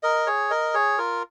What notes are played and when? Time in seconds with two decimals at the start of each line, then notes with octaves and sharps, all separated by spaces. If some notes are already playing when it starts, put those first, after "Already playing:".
0.03 A#4 D#5
0.27 G#4 C#5
0.50 A#4 D#5
0.74 G#4 C#5
0.98 F4 A#4